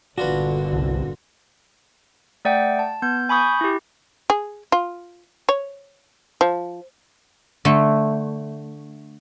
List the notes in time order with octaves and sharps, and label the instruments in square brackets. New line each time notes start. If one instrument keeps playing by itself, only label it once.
[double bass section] G1 A#2 D3 [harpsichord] D4 F4 B4 [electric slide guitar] F#4
[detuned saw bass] C2
[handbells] A3 D5 F#5 G5
A5
B3 G6
G#5 B5 C#6 D#6 G6
E4 G4
[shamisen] G#4
F4
C#5
F3
[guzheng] D3 A3